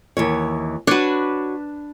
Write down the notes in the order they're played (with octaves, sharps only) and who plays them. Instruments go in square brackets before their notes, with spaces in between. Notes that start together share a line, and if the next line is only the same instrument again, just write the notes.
[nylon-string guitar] D#2 E3 C#5
[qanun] D4 B4 [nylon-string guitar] F#4 C#5